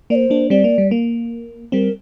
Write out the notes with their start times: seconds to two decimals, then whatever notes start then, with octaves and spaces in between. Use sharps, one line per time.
0.10 A#3 D5
0.15 C5
0.30 A#3 D4
0.50 G3 C4 D5
0.64 A#3
0.78 G3
0.91 A#3
1.72 G3 C4 A#4